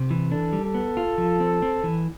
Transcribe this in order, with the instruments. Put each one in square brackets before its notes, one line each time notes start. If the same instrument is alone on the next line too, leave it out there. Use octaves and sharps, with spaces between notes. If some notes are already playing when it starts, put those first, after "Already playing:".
Already playing: [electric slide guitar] C3
E3
[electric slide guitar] D4 [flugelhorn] A4
[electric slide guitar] G3
[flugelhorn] A4
[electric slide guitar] B3
F4
F3
C4
C4
E3